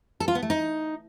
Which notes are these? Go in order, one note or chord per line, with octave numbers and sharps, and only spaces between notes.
A4
F4
B3
A3
D#4